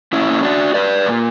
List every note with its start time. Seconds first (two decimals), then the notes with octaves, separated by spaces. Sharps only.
0.13 A#2 A#3 C#4 E4
0.43 D4 F#4
0.74 B4 D5
1.06 A#2 A#3